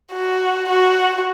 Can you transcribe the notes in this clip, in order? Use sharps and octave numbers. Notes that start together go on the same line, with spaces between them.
F#4
F#4